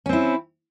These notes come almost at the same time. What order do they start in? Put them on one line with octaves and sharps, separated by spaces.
C#4 C4 E4